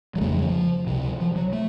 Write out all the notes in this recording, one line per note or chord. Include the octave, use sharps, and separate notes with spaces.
F#3
F2 C#3 A3
F3
F#3
F3
C#2 C3
F3
F#3
A3